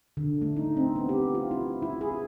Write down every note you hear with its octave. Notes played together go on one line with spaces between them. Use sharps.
D3
A3
D#4
C4
B3
G4
F4
E4
E4
G#4